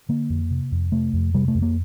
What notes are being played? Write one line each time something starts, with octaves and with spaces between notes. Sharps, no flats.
D3 A#3
F2
C3
F2
C3 A3
F2
C3 G3
A3
F2
A#3